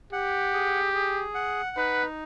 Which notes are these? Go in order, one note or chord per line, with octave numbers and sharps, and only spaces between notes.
G4 F#5
G#4
G#4
F#5
D#4 B4